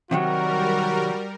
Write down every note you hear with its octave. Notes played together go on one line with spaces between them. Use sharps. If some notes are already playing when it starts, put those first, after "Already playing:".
C3 D#3 F#3 G3 F#4 A#4